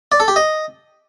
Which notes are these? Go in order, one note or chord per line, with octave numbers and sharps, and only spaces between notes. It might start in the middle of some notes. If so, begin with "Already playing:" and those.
D5
A4
G4
D#5